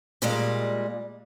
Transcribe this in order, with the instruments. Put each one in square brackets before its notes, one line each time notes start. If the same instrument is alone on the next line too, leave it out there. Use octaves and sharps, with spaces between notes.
[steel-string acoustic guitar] A#2 G3 G#3 A#3 D5 D#5